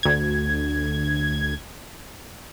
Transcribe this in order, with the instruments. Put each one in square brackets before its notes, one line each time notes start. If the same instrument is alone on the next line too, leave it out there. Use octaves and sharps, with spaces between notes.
[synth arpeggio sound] D2 G#6